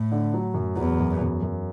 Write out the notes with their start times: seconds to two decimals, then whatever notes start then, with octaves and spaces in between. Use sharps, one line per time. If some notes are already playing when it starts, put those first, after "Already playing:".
Already playing: A2
0.12 D3
0.33 F#3
0.54 F#2
0.76 E2 F#3
0.99 F#2
1.21 F#2
1.42 F#2